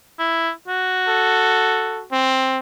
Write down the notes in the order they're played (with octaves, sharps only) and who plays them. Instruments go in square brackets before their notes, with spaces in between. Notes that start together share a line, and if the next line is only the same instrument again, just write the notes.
[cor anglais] E4
F#4
[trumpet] A4
C4